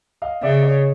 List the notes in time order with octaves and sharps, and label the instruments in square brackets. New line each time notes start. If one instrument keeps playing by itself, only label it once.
[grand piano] D#5 F5
[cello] C#3 [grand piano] D5 E5
[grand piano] C#5 D#5